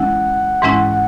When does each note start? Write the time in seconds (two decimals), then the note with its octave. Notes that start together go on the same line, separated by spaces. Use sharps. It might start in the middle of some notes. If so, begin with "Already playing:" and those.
Already playing: E3 G#3 C#4 E4 F#5
0.62 G#2 E3 G#3 C#4 E4